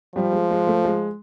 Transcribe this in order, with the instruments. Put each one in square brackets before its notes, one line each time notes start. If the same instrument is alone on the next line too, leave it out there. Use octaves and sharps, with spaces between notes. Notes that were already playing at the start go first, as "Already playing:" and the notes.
[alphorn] F3 [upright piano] G3
[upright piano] G#3
G#3
A3
G#3